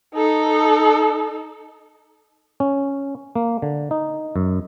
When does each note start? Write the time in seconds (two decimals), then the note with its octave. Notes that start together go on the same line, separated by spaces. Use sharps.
0.15 D#4 A4
2.60 C#4
3.35 A#3
3.62 D3
3.91 D#4
4.36 F#2